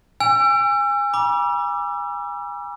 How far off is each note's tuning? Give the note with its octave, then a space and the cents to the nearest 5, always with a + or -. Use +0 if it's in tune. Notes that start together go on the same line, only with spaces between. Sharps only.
G#5 -30 E6 +35
B5 -45 D6 +0